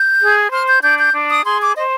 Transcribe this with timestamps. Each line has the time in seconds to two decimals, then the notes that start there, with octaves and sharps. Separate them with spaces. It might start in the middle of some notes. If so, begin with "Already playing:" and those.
Already playing: G6
0.20 G#4
0.51 C5 F6
0.67 G6
0.82 D4 G6
0.98 G6
1.14 D4
1.30 D#6
1.46 G#4 C6
1.60 D6
1.77 C5 D#5